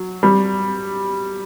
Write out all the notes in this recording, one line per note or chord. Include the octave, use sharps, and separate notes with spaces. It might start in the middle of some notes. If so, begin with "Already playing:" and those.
Already playing: F#3
G3